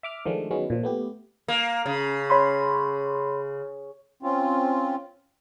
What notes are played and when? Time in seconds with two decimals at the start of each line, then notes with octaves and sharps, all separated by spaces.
0.03 E5 D6 F6
0.25 D#3 F3 G#3 A3 D4
0.51 D#3 F#3 G#3 B3 C#4
0.70 A#2 F3
0.83 A3 B3 G4
1.48 A#3
1.86 C#3
2.30 C#5 B5 C6
4.23 C4 C#4 F4